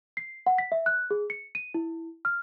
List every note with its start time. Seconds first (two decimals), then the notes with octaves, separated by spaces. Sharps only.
0.17 C7
0.47 F#5
0.58 B6
0.72 E5
0.86 F#6
1.11 G#4
1.30 C#7
1.55 D#7
1.74 E4
2.25 F6